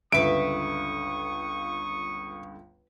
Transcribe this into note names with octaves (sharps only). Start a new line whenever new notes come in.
G1 C#2 D3 B4 E5 C#6 D#6 D7